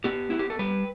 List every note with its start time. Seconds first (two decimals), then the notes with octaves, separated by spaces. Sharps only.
0.04 B3 G4
0.30 B3 E4
0.39 G4
0.50 A4
0.59 G3 B4